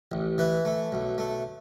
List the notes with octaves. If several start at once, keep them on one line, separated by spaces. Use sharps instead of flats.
A1
E3 B4
A3
B1
A3